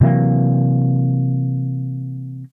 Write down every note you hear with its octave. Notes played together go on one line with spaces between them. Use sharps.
C3 E3 F#3 A#3